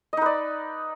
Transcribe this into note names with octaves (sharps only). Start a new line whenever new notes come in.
D#4 B4 D5 D#5